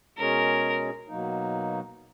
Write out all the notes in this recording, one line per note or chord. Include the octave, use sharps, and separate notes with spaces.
B2 G#3 C#4 G#4 A#4 C#5
B2 F#3 A#3 D#4